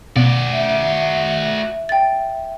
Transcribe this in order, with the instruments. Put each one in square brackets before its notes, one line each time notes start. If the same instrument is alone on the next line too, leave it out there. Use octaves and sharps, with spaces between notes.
[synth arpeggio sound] B2 [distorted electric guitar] F#4 D5
[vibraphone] E5
[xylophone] G5 A6